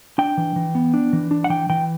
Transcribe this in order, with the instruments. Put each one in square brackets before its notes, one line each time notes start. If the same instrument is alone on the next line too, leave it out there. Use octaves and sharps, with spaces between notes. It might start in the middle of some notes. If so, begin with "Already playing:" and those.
[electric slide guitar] D4 G5
E3
E3
B3
D4
E3
D4
F#5
E3 G5
E3 G5